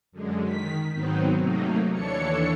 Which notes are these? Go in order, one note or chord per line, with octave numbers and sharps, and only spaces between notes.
F#2 D3 G#3
D#3 B6
G#2 D#3 F#3 B3 C4 D#4
C3 F#3 A3 A#3 D#4
D#2 E3 D4 A4 C#5 C#7